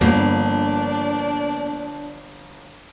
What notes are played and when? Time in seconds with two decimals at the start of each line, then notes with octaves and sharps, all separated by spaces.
0.01 G1 G2 F3 A#3 B3 D4